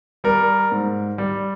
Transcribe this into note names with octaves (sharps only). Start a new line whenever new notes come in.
G3 A#4
G#2
G3